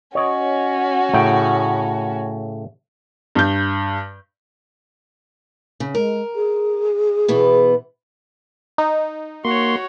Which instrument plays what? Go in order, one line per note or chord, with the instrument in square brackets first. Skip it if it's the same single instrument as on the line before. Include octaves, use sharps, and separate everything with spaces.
[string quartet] C#4 F#4 [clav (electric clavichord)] C#5 D#5
[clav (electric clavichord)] A2 C#3 G5
[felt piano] G2 G6
[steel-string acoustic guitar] C#3
[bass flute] G#3 [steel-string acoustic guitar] A#4
[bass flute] G#4
[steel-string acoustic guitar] B2 E3 B3
[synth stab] D#4
[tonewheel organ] A#3 C6 [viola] F#4 C#5